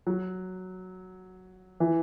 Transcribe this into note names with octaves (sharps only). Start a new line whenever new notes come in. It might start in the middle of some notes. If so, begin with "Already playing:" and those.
F#3
E3